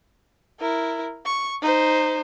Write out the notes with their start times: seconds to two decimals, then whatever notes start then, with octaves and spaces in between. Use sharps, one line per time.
0.59 E4 A#4
1.25 C#6
1.61 D#4 C5